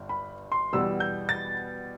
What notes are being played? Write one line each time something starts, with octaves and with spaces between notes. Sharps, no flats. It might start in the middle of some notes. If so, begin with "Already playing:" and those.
Already playing: G1 G2
B5
C6
E2 B2 G3 B3 E6
G6
A6